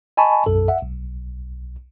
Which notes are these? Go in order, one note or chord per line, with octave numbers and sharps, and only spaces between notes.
D#5 G#5 A5 B5 C#6
B1 F#2 A4
E5 F#5
B1